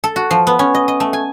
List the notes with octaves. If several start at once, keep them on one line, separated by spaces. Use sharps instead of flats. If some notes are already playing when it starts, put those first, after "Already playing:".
A4
F#4
F3
B3
C#4
D#5
D#5
A3
G#5